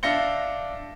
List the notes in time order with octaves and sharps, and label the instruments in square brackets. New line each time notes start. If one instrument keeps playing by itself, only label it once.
[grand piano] D4 E5 F5 A#6 C#7 G7